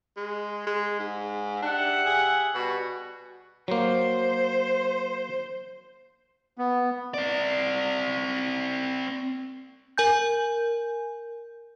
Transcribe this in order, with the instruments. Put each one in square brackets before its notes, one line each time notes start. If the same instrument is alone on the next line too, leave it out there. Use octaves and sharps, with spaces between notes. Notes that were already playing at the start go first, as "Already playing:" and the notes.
[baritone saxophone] G#3
G#3
G#2
[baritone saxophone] D4 [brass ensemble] G4 E5 F#5
[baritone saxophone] G#4
[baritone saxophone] B2 [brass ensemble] G3 F#4
[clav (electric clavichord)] F#3 A#3 [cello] C5
[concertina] B3
[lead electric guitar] C4 D5
[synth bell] A#4 G#5 G6